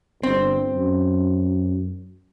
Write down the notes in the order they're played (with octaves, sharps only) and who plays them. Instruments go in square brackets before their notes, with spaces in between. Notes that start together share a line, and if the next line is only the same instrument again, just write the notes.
[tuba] G1 [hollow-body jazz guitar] C4
[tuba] F#2